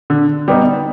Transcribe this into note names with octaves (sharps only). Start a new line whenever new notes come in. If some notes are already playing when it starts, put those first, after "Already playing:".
D3
G3 B3 D#4